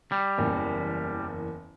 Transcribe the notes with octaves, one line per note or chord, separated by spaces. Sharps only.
G3
F#1 E2 A#3